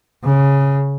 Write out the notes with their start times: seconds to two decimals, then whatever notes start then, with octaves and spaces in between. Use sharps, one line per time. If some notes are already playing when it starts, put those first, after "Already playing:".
0.24 C#3